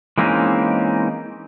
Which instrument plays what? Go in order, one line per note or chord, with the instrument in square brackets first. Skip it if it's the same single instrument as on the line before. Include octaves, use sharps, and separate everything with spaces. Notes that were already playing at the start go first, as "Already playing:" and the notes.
[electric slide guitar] E3 G#3 A#3 C4 C#4 D#4